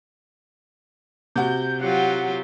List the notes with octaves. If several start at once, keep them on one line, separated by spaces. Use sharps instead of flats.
C3 F#4 G6
F#3 F4 G4 F#5